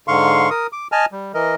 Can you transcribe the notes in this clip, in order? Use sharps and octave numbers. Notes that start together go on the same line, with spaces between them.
G#2 D3 F5 C6 C#6
A#4 D#6
D6
D#5 G#5 A5 F6
G3
E3 A#4 D#5